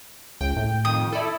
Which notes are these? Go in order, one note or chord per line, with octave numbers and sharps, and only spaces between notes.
C#2 G5
A2
F2 D#3 D#6
E4 A4 D5